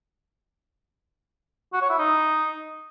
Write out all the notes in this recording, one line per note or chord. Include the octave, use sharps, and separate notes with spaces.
F#4
C#5
E4
D#4